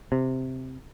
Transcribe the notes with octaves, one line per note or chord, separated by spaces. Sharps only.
C3